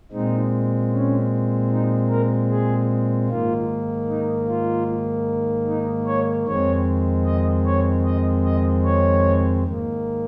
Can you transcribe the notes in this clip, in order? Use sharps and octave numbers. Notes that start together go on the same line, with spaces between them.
A#2 G#3 C4 D#4
C#4
D#4
A#4
G#4
G#2 D#3 A#3 F4
D#4
F4
D#4
C#5
F2 D#3 G#3 C4 C#5
D#5
C#5
D#5
D#5
C#5
G#2 D#3 A#3